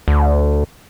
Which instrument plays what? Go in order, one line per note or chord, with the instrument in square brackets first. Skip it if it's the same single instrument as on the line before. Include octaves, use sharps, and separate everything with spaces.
[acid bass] D2